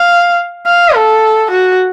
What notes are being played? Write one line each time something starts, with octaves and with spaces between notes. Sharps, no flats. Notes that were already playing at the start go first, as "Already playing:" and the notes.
Already playing: F5
F5
A4
F#4